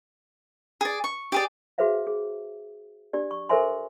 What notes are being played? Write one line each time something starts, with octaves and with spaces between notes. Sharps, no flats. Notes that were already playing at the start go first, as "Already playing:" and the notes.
G#4 D5
C#6
G4 G#4 D5
F#4 G#4 B4 C5 E5 F5
G#4
D4 G4 D5
C#6
A4 A#4 C5 E5 G#5 C6